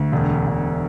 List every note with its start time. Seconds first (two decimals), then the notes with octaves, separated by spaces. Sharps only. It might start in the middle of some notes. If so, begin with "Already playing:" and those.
Already playing: D2
0.12 E1
0.47 E1